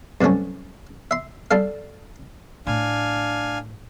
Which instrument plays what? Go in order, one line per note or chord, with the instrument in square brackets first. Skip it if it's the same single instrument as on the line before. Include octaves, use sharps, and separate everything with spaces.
[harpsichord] G2 C3 F#3 A3 C#4
E5 C6
G3 G4 A4 F5
[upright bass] A2 [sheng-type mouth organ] D4 F5 G#5